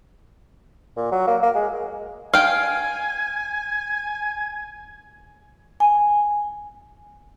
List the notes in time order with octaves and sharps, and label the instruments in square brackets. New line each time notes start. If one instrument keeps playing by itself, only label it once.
[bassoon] A#2
F#3
A#3
A#3
G#3
[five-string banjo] F5 G5 [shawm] G#5
[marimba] G#5